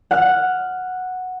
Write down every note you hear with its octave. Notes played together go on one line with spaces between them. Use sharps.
F#5 F6